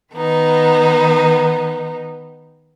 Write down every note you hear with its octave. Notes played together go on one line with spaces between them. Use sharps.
D#3 B3 D#4